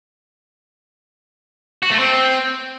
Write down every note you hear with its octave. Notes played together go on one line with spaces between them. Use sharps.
F#4
A3
C4